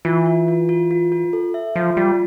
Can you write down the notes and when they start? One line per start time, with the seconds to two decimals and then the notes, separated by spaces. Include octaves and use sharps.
0.05 E3 F4
0.26 F4
0.48 F4
0.69 F4
0.91 F4
1.12 F4
1.33 A4
1.54 E5
1.76 F3 F4
1.97 G3 F4